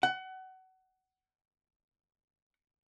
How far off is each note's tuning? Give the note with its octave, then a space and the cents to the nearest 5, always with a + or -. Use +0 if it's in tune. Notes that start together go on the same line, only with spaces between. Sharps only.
F#5 +25